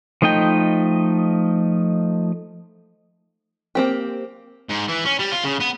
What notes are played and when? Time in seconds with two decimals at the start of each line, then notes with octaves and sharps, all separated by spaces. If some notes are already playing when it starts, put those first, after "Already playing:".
0.22 F3 A3 D#4 D#5 G5
3.75 A#3 C4 G4
4.69 G#2
4.89 E3
5.06 C#4
5.20 G3
5.32 F4
5.45 C#3
5.60 B3